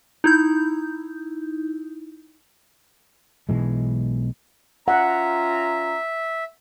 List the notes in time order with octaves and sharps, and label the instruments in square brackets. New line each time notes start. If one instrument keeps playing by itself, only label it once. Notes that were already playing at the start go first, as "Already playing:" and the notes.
[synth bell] D#4 E4 G6
[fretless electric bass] B1 B2 E3 G#3
[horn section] C#4 F4 A#5 [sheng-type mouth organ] E5 [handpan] F#5